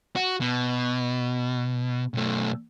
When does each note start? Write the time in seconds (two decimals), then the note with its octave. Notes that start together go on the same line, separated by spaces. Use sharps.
0.16 F#4
0.41 B2
2.14 B1 A3